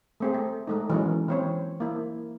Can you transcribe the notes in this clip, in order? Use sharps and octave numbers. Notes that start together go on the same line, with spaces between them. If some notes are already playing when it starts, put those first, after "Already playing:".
A3 C4 G#4
A3
G#3 A3 D#4
E3 F#3 G#3 A#3 C#4
E3 C4 C#5
A#3 E4